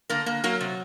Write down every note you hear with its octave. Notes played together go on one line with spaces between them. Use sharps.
D3 A#3 A#4
A#3
F#3 A#3 A#4
C3